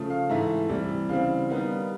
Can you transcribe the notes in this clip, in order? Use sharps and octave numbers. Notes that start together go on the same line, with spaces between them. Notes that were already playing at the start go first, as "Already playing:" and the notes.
Already playing: C#3 F3 A3
F5
G#2 E3 A3 E5
C3 E3 G3
C#3 E3 G3 C4 F5
D#3 G3 B3 D#4